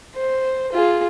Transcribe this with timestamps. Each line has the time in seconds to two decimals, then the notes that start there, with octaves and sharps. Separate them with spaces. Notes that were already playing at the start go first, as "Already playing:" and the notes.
0.15 C5
0.72 F4 G#4